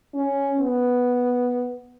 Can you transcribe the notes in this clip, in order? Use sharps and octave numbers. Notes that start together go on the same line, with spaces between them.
C#4
B3